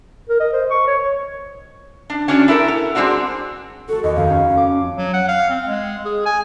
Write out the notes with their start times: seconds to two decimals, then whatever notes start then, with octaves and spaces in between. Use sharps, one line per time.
0.29 A#4
0.40 D#5
0.53 C5
0.70 C#6
0.87 C#5
2.10 D4
2.28 C#4 D4 F#4 C#5 D5
2.48 E4 G4 A4 A#4
2.68 B3
2.95 G3 G#3 C4 D4 F#4
3.89 A3 F#4 A4
4.04 D#2 D#5
4.16 F2 D#3 B3 F5
4.30 C#4
4.57 D6
4.98 F#3
5.13 F#5
5.28 F5
5.50 C4
5.66 G#3
6.06 G#4
6.26 G#5